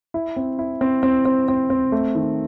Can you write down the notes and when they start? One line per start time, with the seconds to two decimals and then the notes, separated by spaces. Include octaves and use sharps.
0.14 E4
0.37 C4
0.59 E4
0.81 C4
1.03 C4
1.25 C4
1.48 C4
1.70 C4
1.92 A3
2.15 D#3